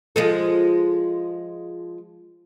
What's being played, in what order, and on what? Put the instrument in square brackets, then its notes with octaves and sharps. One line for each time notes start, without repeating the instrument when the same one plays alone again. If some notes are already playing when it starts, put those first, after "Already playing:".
[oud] F3 G#3 A4